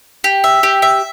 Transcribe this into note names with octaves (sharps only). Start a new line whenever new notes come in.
G4
E5
G4
E5